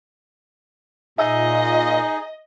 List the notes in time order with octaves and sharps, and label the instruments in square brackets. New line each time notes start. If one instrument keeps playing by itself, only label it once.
[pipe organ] A#2 [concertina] D#4 G#4 [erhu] D#5 [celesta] E5 E6